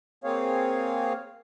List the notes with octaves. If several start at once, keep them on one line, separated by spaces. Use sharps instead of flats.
A#3 C4 G#4 C#5 F5